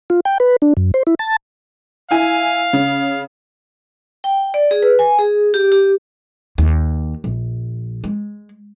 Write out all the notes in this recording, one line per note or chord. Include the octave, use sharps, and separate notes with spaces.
F4
G5
B4
D4
F#2
C5
E4
A5
E4 F5 G#5
C#3
G5
D5
G#4
B4
G#5
G#4
G4
G4
D#2
A#1
G#3